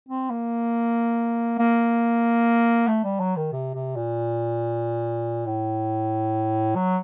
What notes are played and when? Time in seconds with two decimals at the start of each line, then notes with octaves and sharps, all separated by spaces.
0.09 C4
0.30 A#3
1.59 A#3
2.88 A3
3.04 G3
3.20 F#3
3.36 D#3
3.53 C3
3.74 C3
3.96 A#2
5.46 A2
6.75 F#3